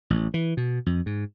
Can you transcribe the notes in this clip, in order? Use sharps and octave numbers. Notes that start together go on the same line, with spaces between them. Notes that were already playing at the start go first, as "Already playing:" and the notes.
A1
E3
B2
F2
G#2